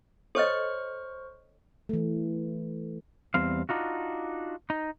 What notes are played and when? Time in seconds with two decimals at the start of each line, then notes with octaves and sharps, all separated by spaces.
0.35 A4 C5 C#5 D#5 C#6 F6
1.89 E3 A3
3.34 E2 G3 C4 F5
3.69 D4 D#4 F4 F#4
4.70 D#4